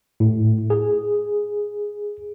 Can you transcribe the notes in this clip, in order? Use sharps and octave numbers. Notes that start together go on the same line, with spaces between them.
A2
G#4